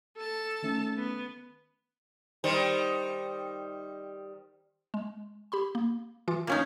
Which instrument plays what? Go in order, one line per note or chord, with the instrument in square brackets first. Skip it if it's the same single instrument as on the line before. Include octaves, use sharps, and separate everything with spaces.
[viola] A4 A5
[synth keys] D#3 A3 C#4
[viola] B3
[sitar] D#3 G3 C5
[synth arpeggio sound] G#3
G4 B5 C6
A#3
E3 F4 D6
[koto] A#3 C#4 D#4 [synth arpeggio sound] A6